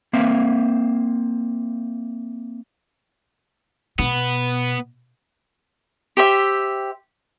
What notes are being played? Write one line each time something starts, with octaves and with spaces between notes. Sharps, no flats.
A#3 C4 E5 F5
B2 B3
G4 C5 E5